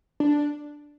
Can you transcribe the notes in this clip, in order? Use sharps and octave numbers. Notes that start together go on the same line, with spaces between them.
D4